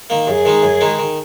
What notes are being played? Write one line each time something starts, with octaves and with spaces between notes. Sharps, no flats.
D#3 A#3
F#2 G#4
D#3 G#3 D#4
F#2
D#3 G#3 D#4
D#3